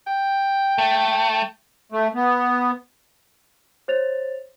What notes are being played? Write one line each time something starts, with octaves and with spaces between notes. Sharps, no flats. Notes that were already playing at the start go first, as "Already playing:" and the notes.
G5
A3
A3
B3
C5 C#5 A6 F7